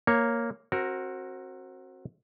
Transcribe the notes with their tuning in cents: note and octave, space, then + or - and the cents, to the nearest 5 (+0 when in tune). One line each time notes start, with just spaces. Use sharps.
A#3 +0 C#5 +0
C4 +30 F#4 +0 A#4 +0